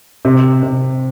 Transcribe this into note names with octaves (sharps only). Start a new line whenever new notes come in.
C3
C3